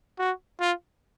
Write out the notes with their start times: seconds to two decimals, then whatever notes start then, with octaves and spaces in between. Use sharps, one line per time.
0.19 F#4
0.60 F4